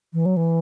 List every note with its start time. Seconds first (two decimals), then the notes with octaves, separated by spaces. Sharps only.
0.13 E3
0.26 F#3
0.37 E3